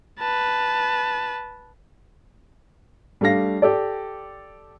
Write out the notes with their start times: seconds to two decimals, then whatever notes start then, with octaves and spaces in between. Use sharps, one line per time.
0.19 B4 A5
3.21 G3 A3 D4 F5 A#6
3.62 G4 A4 D5